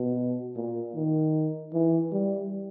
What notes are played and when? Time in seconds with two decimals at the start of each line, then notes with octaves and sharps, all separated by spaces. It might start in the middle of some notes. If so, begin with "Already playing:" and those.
Already playing: B2
0.56 A#2
0.95 D#3
1.73 E3
2.12 G3